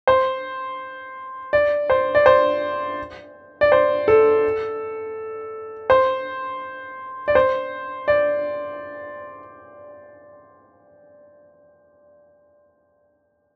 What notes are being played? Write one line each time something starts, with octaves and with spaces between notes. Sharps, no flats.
C5
D5
C5
D5
C5
D5
C5
A4
C5
D5
C5
D5